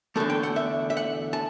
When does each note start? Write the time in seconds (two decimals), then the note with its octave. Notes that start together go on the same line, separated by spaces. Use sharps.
0.16 E2 D3 A3 A4
0.30 G5
0.43 F#5
0.56 E5
0.90 E5
0.97 F#5
1.33 A5